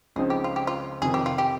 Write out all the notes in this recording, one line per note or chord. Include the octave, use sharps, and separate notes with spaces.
C#2 C#3 F3 C4 D#4 G#4
G4
F4
G4
F4
F2 C3 D#3 G#4
G4
F4
G4